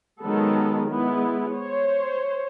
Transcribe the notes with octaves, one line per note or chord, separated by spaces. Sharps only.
D#3 F#3 G#3 B3 A4
G#3 B3 E4
C5 C#5